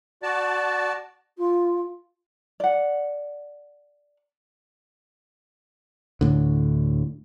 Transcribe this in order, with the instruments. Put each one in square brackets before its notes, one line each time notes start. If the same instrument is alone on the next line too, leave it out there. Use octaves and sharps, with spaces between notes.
[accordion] F#4 D5 A5
[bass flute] F4
[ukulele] D5 F#5
[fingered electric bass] D2 A2 D3